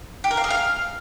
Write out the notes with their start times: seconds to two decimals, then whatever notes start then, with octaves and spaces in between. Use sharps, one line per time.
0.24 G4
0.31 A#4
0.37 F5
0.44 G#4
0.50 F5